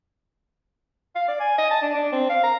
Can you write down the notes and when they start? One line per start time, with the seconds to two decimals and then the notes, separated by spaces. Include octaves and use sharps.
1.16 F5
1.28 D5
1.40 G#5
1.58 D#5
1.71 A5
1.82 D4
1.95 D4
2.12 C4
2.30 F5
2.44 A#5